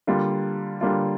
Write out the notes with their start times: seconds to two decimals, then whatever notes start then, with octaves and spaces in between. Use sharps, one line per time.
0.07 D3 G3 A#3 F4
0.81 D3 G3 A#3 F4